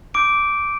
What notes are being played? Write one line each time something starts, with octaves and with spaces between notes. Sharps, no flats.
D6 E6 G6 D7